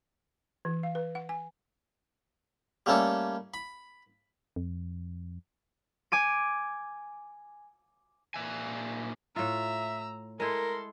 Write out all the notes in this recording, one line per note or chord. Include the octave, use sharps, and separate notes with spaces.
E3
F5
B4
F#5
G#5
G3 A3 A#3 C#4 A4
B5
F2
G#5 D6 D#7
A#2 E5 G#5
A2 F4 E5 A#5 E6
G#3 E4 A4 A#4 C6